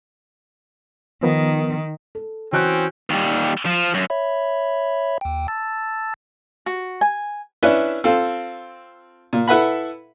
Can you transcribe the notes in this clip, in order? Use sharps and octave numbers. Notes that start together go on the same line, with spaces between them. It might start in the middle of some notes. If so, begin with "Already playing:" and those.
D#3 F3 B3 A#4
A4
E3 C4 C#4 F#4 G5 F#6
D#2 G3
F3
F#2
C#5 E5 B5
D#2 G5
A5 E6 A6
F#4
G#5
C#4 D4 E4 B4 E5
C4 F4 A4
A#2
E4 A4 B4 E5 F#5 B5